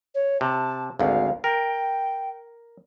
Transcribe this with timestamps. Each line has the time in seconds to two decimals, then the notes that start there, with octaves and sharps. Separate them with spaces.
0.15 C#5
0.41 C3 A5
0.99 G#1 D2 F5
1.44 A#4 G5